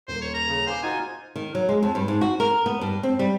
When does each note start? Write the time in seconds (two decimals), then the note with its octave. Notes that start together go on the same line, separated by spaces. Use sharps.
0.08 D#1 A#3 C5
0.22 C#5
0.34 A#5
0.48 C#3
0.67 C5 F5 G#5 D6
0.83 D#4 F4 F#4 C5 F#5 G#5
1.36 D#3
1.55 F#3
1.69 G#3
1.83 F2
1.95 G2
2.08 G#2
2.21 F#4
2.40 A#4
2.66 B3
2.81 G2
3.03 C4
3.19 G3